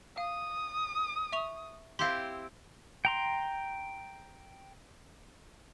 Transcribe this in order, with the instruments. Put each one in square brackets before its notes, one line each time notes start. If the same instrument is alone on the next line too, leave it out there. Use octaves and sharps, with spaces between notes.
[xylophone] F5 [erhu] D#6
[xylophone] E5 C#6 F7
[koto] C4 E4 G4 [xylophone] F5 C6
[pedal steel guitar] G5 A#5 C6